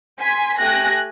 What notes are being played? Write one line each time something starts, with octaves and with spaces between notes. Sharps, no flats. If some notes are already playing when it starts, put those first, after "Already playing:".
G#5 C6 B6
A3 G4 G#5 F#6 A#6